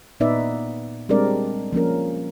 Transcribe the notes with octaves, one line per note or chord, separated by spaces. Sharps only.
A#2 B3 D#4 B4 D5 E5
G3 G#3 C4 D4 A#4 D5
F3 A#3 C#4 A#4